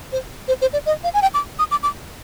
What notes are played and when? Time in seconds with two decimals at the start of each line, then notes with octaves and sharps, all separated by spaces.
0.12 C5
0.48 C5
0.61 C5
0.73 D5
0.86 D#5
1.04 F5
1.14 G#5
1.22 G5
1.34 D6
1.59 D#6
1.71 D6
1.83 D6